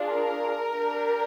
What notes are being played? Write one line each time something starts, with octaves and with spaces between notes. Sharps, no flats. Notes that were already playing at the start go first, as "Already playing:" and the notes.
Already playing: D4 F4 G#4
A#4
D4 G4